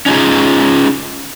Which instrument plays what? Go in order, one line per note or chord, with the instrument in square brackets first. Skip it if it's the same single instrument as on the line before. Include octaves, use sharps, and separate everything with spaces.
[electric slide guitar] C#4 D#4 F4 G#4